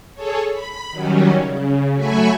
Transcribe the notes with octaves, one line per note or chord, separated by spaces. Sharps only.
G#4 A4 C#5
B5
D#3 F#3 G3 C#4
C#3
F#3 A3 E5 G#5 B5 C#6